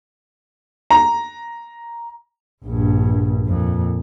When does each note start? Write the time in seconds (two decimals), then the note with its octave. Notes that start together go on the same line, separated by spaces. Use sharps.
0.91 A#5
2.64 A#1 G2
3.46 F2 A#2